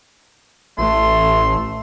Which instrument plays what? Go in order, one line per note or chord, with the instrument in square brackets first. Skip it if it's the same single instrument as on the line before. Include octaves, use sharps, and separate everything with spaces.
[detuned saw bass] A1 [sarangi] A3 [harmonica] C6